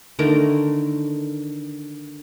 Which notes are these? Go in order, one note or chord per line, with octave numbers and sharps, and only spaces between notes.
D3 D#3 A3 A#4